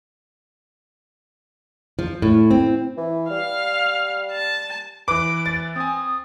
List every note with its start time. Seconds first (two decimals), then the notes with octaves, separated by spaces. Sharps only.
1.99 F3
2.22 A2
2.51 C4
2.97 E3
3.30 G3 F5
4.32 A5
5.08 E3 B4 D6 D7
5.46 A6
5.76 C4 G#5 D#6